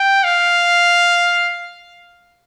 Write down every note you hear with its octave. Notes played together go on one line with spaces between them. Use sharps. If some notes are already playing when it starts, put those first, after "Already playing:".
Already playing: G5
F5